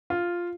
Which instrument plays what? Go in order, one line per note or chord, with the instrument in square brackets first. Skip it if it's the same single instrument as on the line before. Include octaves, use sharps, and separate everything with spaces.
[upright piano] F4